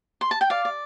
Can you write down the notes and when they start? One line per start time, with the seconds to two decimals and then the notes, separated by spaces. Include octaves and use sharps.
0.21 C6
0.31 A5
0.41 G5
0.50 D5 F5
0.65 D5